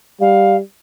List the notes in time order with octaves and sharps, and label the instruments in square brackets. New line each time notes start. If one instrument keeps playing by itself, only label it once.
[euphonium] G3 [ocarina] F5